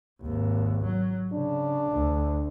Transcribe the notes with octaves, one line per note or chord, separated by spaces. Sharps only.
G#1 D#2
F#3
C#3 D4
D2